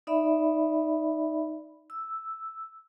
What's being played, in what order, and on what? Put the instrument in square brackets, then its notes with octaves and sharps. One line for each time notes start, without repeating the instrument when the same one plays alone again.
[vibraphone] D#4 D5 E5 B5
E6